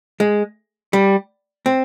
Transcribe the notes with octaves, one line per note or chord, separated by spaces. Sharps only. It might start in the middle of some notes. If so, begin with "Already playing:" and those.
G#3
G3
C4